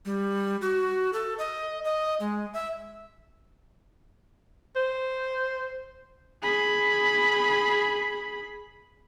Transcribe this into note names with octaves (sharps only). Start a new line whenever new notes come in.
G3
F#4
A4
D#5
D#5
G#3
E5
C5
G#4 B5